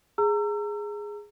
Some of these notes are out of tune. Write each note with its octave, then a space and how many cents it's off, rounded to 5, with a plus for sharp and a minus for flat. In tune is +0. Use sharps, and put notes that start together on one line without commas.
G#4 +0 A#5 -25 E6 +30